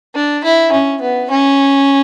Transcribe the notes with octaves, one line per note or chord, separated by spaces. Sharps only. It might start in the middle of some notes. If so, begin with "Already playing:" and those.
D4
E4
C#4
B3
C#4